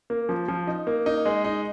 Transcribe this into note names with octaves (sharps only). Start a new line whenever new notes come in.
A#3
F3
F3
D#4
A#3
D#4
G#3
D#4